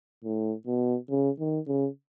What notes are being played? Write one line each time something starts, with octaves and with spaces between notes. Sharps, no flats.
A2
B2
C#3
D#3
C#3